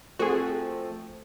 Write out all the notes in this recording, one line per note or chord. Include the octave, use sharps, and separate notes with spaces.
F3 A3 C4 F#4 G#4